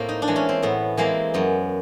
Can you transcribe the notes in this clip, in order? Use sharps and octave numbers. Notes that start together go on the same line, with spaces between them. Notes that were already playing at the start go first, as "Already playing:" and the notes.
Already playing: A2 A#3 C4
D#4
D4
E3 G#3
C#4
C4
A2 B3
E3 G#3 A#3 C4
F#2 B3